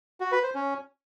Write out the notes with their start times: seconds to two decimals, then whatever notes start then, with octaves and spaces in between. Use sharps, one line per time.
0.20 F#4
0.32 B4
0.43 C5
0.55 C#4